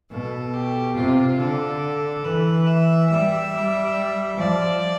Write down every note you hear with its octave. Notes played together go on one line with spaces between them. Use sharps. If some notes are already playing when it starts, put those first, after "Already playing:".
B2 A4
G4
C3 F4
D3 A4
E3 B4
E5
G3 E5
G3
F3 D5